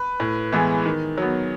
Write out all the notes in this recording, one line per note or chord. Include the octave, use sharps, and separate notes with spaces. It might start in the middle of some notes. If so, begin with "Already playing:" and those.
Already playing: B4
A2
E3 G#3 B3
D#3
F#3 B3